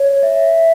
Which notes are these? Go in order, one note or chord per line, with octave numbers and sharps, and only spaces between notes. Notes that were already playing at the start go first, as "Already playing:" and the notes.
Already playing: C#5
E5